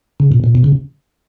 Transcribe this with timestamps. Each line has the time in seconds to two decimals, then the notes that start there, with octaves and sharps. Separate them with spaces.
0.20 C#3
0.32 A#2
0.44 A#2
0.55 B2
0.64 C#3